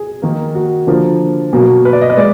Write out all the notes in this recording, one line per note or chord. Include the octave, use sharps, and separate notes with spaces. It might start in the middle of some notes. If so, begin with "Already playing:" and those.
Already playing: G#4
D#3 A#3
F#4
D3 F3 A#3 A#4
B2 F#3 A#3
B4
D5
D#5
B4
G#3 D5